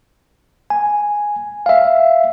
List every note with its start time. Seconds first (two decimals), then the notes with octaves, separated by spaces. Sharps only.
0.70 G#5
1.66 E5 F5